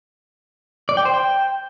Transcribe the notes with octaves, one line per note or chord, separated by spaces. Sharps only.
D5
G5
C5
G5